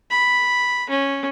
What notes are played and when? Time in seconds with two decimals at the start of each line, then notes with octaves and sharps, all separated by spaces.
0.11 B5
0.90 C#4